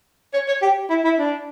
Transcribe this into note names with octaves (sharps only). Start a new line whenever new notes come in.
C#5
C#5
G4
E4
E4
D4